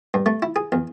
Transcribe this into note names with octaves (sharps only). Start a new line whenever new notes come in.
G2
A3
E4
G#4
E2